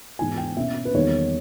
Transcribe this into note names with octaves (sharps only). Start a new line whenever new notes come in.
G#2 E3 G#3 B3 G#5
G5
B2 A#3 C#4 E5
B4
E2 D#3 G3 A#3 C#5